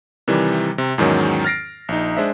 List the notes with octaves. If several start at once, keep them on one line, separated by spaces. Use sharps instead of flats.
C3 D#3 E3 G3
C3
E2 G#2 D#3 F#3 C#4
F6 A6 A#6 C7 D7
A#1 D#4
G#3 D4 C5 E5